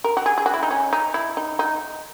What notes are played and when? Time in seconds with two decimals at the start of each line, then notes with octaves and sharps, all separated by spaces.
0.04 A#4
0.17 F#4
0.26 G#4
0.38 G#4
0.46 F#4
0.54 E4
0.63 D#4
0.71 C#4
0.93 D#4
1.14 E4
1.37 D#4
1.59 D#4